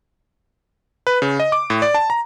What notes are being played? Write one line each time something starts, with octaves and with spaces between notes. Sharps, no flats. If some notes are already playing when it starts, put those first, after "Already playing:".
B4
C#3
D#5
D6
A2
D5
A5
A#5